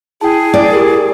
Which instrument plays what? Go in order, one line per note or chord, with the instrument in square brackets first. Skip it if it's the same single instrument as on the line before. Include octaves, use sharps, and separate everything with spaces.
[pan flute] E4 [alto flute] G#4 [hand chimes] G5 A5
[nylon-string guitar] D5
[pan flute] E4 [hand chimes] G4 A#4